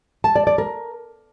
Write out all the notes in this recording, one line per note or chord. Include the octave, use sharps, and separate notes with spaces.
A5
D5
D5
A#4